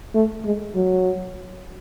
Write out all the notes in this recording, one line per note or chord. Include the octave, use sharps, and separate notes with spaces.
A3
G#3
F#3